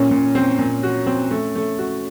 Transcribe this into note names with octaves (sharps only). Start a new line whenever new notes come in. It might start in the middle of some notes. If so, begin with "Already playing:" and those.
Already playing: A#2 C#4
A#2
C4
A#2
F#4
C4
A3
A3
F#4